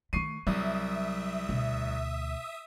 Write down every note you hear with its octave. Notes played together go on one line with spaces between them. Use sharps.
D#3 A3 C#6 C7 D#7
C2 F#3 E5 D#6
D2 B2